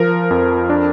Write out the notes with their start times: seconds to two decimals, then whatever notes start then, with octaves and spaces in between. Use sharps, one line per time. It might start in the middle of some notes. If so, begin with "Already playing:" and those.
Already playing: F3 A#4
0.31 F2
0.70 D4